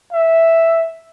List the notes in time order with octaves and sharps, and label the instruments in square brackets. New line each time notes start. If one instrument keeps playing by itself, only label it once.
[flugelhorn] E5